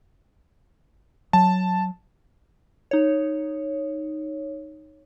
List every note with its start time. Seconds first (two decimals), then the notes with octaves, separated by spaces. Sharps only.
1.33 F#3 A5
2.91 D#4 C#5